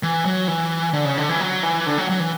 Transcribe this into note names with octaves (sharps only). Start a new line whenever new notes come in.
E3
F#3
E3
D3
C#3
D3
E3
F#3
E3
D3
F#3
F#3
E3